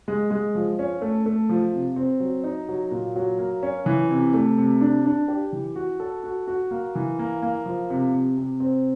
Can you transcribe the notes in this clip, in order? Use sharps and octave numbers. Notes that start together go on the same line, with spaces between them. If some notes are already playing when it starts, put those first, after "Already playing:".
G#3
G#3
F3
C#4
A3
A3
F3
C3
C4
F#3
D#4
F#3
A#2
F#3
A#3
C#4
E3
C3
A3
C3
D4
D4
G4
E3
F#4
A4
F#4
F#4
A#3
E3
A#3
A#3
F3
C3
C3
C3
C4